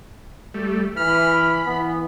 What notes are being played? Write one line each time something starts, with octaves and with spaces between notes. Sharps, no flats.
G3 A3
E3 B5 F6
E3 B3